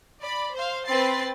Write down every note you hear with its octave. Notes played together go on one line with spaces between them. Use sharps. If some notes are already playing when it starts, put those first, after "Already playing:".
D5 B5
C5 F5
C4 B4 A6 C7